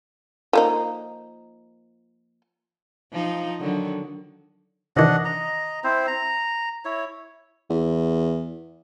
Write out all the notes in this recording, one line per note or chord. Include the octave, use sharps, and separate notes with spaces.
F3 A#3 D#4
F3 D#4
D3 D#3 F#3
C3 D#3 E3 D4 D#5 F#5
D#5 A#5
C4 E4 C5
A#5
E4 C#5
E2